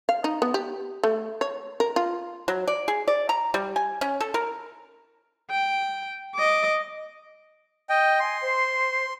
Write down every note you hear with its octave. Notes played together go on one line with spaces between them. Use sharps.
F5
D#4
B3
G4
A3
C#5
A#4
F4
F#3
D5
G#4
D5
A#5
G3
G#5
C#4
A4
A#4
G5
D#5 D6
D#5 G5
G#5 C6
C5